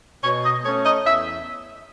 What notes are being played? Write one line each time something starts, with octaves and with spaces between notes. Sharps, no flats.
B2 C#5
D#5
A3 C#4 C#5
D#5
E2 E5